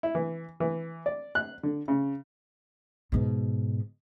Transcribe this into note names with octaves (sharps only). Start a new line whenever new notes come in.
E4
E3
E3
D5
F#6
D3
C#3
G#2 B2